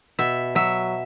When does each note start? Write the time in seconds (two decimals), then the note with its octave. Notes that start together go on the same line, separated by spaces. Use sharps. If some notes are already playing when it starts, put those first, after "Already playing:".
0.19 B2 E5
0.55 F#3 E5